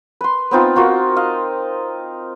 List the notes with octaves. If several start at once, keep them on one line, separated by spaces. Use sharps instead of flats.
B4 C6
B3 C4 D#4 F4
D#4 F4 F#4 A#4
D#5 F5